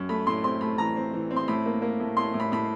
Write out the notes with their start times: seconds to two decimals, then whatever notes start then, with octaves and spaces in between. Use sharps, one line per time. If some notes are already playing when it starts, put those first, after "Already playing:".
Already playing: F#2
0.09 A3 B5
0.27 A2 C6
0.44 C4 C6
0.61 A3 B5
0.78 E3 A#5
0.96 C4
1.13 E3
1.31 C4
1.36 C6
1.48 A2 B5
1.66 A#3
1.82 A#3
2.00 A2
2.17 A2 C6
2.34 A2
2.40 B5
2.52 A2 B5